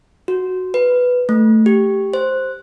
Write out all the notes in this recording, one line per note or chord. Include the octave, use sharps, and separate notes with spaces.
F#4
B4
A3
G4
C5